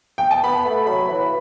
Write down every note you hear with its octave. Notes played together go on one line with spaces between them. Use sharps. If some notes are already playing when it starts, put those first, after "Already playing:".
G5
A5
B3 B5
A3
F#3 B5
E3